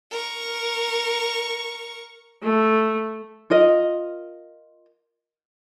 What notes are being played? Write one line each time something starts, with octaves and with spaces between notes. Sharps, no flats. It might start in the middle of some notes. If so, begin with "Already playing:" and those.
A#4 C#6
A3
F4 A#4 D#5